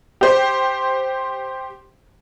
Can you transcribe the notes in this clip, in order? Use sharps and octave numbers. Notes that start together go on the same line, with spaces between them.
G4 C5